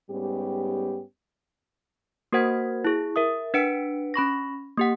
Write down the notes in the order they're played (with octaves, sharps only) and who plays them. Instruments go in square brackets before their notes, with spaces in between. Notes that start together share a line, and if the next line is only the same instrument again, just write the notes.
[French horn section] G#2 G3 B3 C#4 G4
[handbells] A#3 F#4 A#4 C5 F#5 G#6
E4 G#4
A#4 E5 D#6
D4 B4 F#5 C#7 D7
C#4 B5 C#6 A#6
A#3 G4 F#5